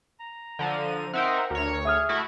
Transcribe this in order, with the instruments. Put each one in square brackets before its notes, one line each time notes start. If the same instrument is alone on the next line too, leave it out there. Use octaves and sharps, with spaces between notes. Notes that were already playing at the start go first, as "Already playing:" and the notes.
[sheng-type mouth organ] A#5
[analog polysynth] D3 F3 D#7
[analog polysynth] C4 D#4 A#4 [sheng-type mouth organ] C5 E5 F#5
[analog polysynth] D2 C#5 [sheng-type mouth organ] A#4
[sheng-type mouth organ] G#4 [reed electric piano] E5 D#6 F6
[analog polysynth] A3 E4 F#4